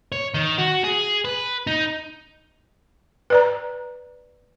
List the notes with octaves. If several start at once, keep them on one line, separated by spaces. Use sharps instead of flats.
C#5
D#3
F#4
G#4
B4
D#4
B4 D5 A#5